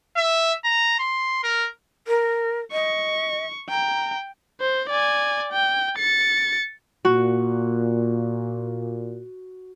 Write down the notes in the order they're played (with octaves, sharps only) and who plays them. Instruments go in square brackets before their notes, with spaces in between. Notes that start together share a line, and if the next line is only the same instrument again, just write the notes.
[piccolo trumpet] E5
A#5
C6
A#4
[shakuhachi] A#4
[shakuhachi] D#5 [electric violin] C#6
[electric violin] G5 [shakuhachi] A#5
[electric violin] C5
D5 G#5
G5
A6 C#7
[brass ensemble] A#2 [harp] F#4